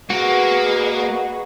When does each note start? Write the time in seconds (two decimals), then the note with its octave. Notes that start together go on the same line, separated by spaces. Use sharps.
0.10 A#3 F#4 G#4 B4 D#5